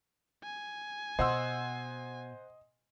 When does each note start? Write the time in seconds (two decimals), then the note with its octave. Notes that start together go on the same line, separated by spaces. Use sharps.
0.43 G#5
1.19 B2 C5 D#5 F#5 C6 E6